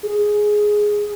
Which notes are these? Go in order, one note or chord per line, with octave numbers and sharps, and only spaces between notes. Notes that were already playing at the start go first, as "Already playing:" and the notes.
G#4